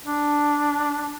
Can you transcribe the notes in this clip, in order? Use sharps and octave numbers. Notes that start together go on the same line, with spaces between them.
D4